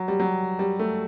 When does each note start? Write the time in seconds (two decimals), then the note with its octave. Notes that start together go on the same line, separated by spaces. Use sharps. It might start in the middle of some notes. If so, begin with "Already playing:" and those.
Already playing: F#3
0.08 G3
0.20 F#3
0.59 G3
0.79 A3